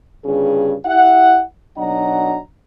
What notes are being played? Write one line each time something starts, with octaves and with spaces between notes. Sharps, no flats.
G1 G2 C#3 G#4
E4 G4 E5 F#5
B1 F#3 D4 D#5 F#5 A#5